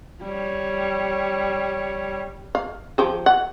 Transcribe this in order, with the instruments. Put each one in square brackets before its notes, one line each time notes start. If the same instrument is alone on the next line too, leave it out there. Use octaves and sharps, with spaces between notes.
[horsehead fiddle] G3 C#5
[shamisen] F5
F3 G4 G#4
F#5